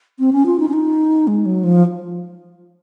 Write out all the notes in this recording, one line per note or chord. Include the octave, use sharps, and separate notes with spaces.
C4
C#4
F4
D#4
C#4
D#4
G#3
F#3
F3